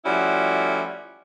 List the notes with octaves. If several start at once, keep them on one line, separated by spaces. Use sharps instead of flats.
F3 G3 A3 C#4 E4 F#4